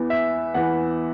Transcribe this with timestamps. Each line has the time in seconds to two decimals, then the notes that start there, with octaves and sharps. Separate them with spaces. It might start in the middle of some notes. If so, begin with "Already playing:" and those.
Already playing: E2 E3 B3
0.10 E5
0.54 E2 E3 B3 F#5